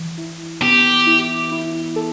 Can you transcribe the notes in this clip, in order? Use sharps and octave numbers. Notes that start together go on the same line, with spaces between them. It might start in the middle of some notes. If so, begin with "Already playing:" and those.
Already playing: E3
E4
B3 G4
E4
E4
A4